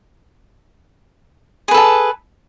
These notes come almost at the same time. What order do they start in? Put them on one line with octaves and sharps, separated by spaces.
G#4 B4 A4 A5